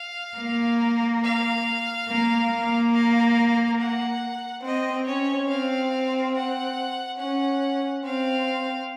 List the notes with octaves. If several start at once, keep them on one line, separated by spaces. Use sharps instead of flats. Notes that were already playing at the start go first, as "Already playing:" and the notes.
Already playing: F5
A#3
F5
A#3
A#3
F5
F#5
C4 D#5
C#4 C#5
C4 F5
F#5
C#4 F#5
C4 F5